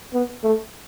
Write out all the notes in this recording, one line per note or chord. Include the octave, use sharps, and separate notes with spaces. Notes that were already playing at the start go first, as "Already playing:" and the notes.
B3
A3